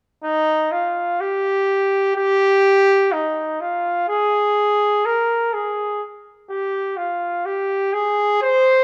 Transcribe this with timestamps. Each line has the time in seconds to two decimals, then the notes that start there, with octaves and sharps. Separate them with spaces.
0.24 D#4
0.72 F4
1.20 G4
2.16 G4
3.12 D#4
3.61 F4
4.09 G#4
5.06 A#4
5.53 G#4
6.50 G4
6.97 F4
7.45 G4
7.93 G#4
8.42 C5